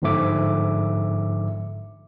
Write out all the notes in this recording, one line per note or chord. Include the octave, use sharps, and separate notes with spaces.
G1 G#2 D3 F3 E5 D6